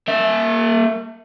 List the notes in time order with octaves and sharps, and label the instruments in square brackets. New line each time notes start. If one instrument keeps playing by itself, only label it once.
[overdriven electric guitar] A#3 E5